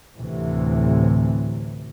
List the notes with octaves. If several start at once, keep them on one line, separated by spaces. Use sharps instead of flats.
D2 A2 C3 E3